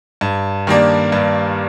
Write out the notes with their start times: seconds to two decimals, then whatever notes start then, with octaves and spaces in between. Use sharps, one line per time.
0.21 G2
0.67 D#3 G3 A#3 D4
1.12 G2